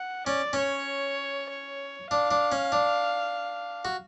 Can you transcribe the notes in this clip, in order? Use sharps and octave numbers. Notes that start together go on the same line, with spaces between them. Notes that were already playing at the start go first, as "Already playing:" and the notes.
Already playing: F#5
C#4 D5
C#4 C#5
C#5
D4 F5
D4
C#4
D4
F#4